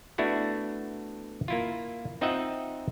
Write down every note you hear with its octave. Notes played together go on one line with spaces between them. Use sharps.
A3 B3 D4 E4 F#4
A#3 E4 F4
C4 D#4 F4 D#5 E5 F#5